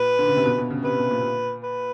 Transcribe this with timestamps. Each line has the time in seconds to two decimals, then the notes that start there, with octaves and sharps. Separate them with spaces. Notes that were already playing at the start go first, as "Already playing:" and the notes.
Already playing: A#2 B4
0.19 D3
0.27 C#3
0.36 C3
0.45 B2
0.58 B2
0.70 C#3
0.84 C3 B4
0.98 B2
1.11 A#2
1.63 B4